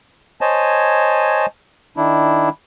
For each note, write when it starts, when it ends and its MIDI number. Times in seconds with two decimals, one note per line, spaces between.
0.41 1.46 72
0.41 1.46 73
0.41 1.46 75
0.41 1.46 80
0.41 1.46 81
1.97 2.49 51
1.97 2.49 62
1.97 2.49 64